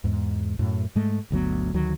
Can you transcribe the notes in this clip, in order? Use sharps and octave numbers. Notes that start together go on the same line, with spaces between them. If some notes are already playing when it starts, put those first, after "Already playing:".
E2 G#2
F#2 A2
G#2 G#3 A3
G1 D2 F#3 B3
D2 D#3 F#3